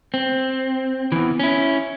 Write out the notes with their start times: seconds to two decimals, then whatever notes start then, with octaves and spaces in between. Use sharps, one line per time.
0.14 C4
1.12 E2 E3
1.40 C#4 E4